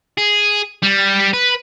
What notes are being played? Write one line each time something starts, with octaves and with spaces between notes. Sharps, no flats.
G#4
G3
B4